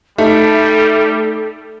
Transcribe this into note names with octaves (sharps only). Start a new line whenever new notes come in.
G3 A3 D#4 A4